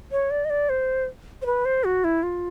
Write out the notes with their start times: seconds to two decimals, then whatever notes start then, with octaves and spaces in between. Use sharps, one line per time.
0.12 C#5
0.31 D5
0.45 D#5
0.50 D5
0.69 C5
1.42 C5
1.46 B4
1.65 C5
1.84 F#4
2.04 E4
2.23 F4